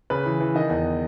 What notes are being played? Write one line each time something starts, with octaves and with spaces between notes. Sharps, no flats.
C#3 B4
E3
E3
D#3 D#5
E2